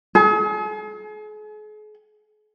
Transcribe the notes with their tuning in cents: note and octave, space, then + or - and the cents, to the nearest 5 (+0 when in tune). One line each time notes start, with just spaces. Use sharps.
G#4 +40